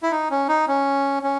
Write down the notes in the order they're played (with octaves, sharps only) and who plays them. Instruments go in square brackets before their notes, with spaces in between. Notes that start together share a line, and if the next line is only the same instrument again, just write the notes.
[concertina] E4
D#4
C#4
D#4
C#4
C#4